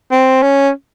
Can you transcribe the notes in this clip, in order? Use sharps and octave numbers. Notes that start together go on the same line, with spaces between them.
C4
C#4